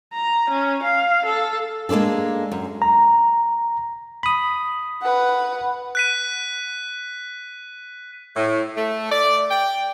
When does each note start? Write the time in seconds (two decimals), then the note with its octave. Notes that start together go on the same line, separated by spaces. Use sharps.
0.13 A#5
0.51 C#4
0.84 F5
1.26 A4
1.89 G#3 A#3 C4 D4 A4
2.51 F#2
2.82 A#5
4.23 B5 D#6
5.02 B4 F#5
5.95 F#6 B6 D#7
8.36 A2
8.77 A3
9.12 D5
9.51 G5